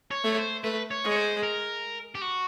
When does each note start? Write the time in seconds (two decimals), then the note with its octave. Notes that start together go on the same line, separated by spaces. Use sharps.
0.11 C#5
0.24 A3
0.32 C#5
0.38 C5
0.63 A3 B4
0.91 C#5
1.03 G#3
1.12 C#5
1.16 C5
1.43 A#4
2.15 G4
2.21 F#4